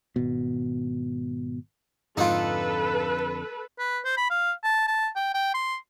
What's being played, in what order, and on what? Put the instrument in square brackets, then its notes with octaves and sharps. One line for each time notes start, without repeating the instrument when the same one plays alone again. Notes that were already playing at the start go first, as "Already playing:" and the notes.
[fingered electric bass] G#1 B2
[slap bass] F2 D3 [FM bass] G#2 [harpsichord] D#4 F4 [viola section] A4 B4
[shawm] B4
C5
B5
F5
A5
A5
G5
G5
C6